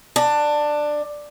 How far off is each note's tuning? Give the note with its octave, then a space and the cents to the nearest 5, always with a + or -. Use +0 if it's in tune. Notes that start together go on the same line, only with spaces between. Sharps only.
D4 +15